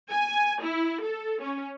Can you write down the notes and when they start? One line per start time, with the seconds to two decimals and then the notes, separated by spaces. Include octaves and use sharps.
0.12 G#5
0.63 E4
1.05 A4
1.41 C#4